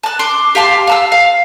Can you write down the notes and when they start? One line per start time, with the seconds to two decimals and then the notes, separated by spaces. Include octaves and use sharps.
0.03 A5 F#6
0.19 C6 D6
0.55 G4 F5 A5 C6
0.87 F5 A5 E6
1.12 F5